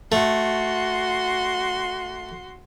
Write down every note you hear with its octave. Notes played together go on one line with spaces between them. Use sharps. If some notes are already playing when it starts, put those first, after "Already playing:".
A3 F#4 C6